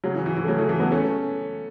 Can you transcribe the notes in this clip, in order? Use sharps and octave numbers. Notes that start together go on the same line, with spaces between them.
C#3 F#3
E3
E3
E3
A3
C#3 F#3
E3 A3
E3 A3
F#3 B3
A3 C#4